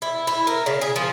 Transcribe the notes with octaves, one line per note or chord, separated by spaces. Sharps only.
E4
E4
A#4
C#3
G#4
F3